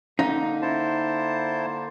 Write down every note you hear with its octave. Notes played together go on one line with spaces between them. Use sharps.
D3 A#3 C#4 D#4 F5
E4 C5 A5